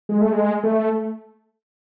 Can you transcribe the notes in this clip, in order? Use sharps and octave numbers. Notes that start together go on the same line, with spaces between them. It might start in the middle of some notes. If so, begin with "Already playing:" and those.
G#3
A3
G#3
A3